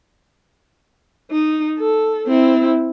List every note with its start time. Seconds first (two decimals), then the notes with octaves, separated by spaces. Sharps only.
1.31 D#4
1.79 A4
2.27 C4 E4